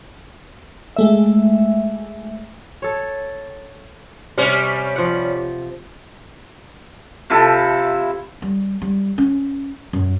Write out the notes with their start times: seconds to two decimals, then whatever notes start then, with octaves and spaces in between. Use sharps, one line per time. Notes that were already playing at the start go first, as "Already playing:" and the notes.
0.96 G#3 A3 E5
2.82 A4 C#5
4.38 C3 G3 C#4
4.96 F3 F#5
7.30 C3 F3 E4 A4
8.42 G3
8.82 G3
9.18 C#4
9.93 F#2